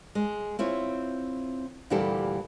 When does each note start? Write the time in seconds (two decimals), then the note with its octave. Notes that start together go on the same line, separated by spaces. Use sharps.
0.15 G#3
0.59 C4 E4 F4 C#5
1.90 D2 A#2 E3 G3 G4 A4